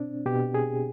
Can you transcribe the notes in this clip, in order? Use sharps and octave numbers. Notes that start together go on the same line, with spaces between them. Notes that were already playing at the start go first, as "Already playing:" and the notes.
Already playing: B2 C4 D4
B2 G4
G#4